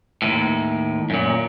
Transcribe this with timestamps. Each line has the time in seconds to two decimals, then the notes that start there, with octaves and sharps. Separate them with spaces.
0.22 D#2 A2
1.10 F#2 A#2